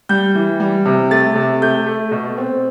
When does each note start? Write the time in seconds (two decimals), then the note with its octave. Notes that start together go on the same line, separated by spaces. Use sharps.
0.09 G3 G6
0.35 E3
0.60 G3
0.86 C3
1.11 A3 A6
1.36 C3
1.62 A3 G6
1.86 A3
2.11 B2
2.38 C4